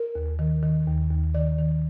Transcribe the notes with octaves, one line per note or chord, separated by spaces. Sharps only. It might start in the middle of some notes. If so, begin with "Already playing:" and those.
Already playing: A#4
D#2
D#3
D#3
D#2
D#2
D#3 D5
D#3